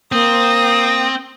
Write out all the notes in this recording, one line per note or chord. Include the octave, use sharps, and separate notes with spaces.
A#3 C4 D#6